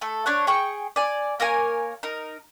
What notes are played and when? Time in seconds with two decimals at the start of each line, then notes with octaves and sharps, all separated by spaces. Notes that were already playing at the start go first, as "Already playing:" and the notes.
0.01 A3 A4
0.26 D4 C#5 F#5
0.47 G#4 G5 C#6
0.96 D5 G#5
1.40 A#3 A#4 C#5 G#5
2.03 D#4 A#4